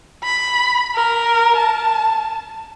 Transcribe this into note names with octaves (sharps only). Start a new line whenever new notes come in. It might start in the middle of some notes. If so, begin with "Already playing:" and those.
B5
A#4
A5